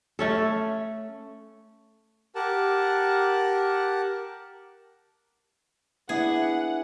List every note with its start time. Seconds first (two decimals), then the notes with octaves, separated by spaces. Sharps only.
0.19 A3 C#4 A4
2.35 G4 A#4 F#5 A5
6.09 B3 D4 E4 G#4 F#5